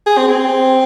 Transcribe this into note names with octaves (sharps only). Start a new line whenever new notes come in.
G#4
C4
C4